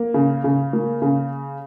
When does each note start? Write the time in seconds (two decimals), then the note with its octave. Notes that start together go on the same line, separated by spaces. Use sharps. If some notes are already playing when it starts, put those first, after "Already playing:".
Already playing: A#3
0.14 C#3
0.44 C#3
0.73 A#3
1.02 C#3